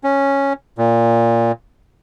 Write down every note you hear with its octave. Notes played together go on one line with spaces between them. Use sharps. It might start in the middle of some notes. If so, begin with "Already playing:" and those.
C#4
A#2